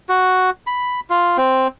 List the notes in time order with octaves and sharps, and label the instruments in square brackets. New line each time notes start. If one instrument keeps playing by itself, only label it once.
[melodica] F#4
B5
F4
C4